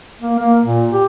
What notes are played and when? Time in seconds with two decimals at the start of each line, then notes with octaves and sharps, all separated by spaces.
0.21 A#3
0.39 A#3
0.63 A#2
0.93 G4